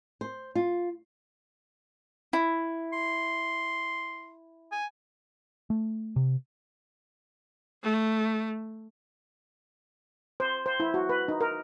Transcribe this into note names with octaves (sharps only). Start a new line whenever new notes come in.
C5
F4
E4
C6
G#5
A3
C3
A3
C5
C5
E4
F#4
B4
D#4
A#4